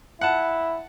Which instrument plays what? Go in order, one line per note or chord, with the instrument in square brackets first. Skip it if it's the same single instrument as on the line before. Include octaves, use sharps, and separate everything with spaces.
[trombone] E4 [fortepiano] F#5 A5